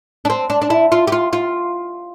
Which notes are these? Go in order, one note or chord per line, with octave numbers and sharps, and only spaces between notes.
D4
C4
D4
D4
E4
F4
G4
F4
F4